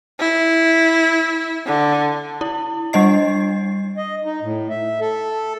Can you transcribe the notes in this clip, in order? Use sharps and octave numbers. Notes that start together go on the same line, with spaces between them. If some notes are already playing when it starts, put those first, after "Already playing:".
E4
D3
E4
G3 D4 D#5 C7
D#5
D#4
A2
E5
A4